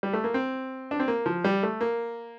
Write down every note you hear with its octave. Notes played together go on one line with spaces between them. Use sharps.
G3
A3
A#3
C4
D4
C4
A#3
F3
G3
A3
A#3